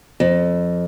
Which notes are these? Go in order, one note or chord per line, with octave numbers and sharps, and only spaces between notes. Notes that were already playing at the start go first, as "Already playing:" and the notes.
F2